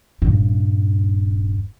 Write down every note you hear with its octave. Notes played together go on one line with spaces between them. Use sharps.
D#1 G2